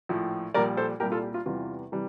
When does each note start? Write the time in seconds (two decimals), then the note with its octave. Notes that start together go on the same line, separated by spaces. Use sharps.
0.09 A#1 A2 F3
0.54 A#1 A#2 G3 A#4 D5
0.77 A4 C5
1.00 C2 A#2 G3 G4 A#4
1.12 F4 A4
1.23 G4
1.34 F4
1.46 E2 C3 E3 G3 F4
1.92 C3 E3 G3